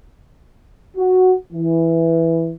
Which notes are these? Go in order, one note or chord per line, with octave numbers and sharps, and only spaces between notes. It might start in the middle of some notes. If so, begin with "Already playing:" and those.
F#4
E3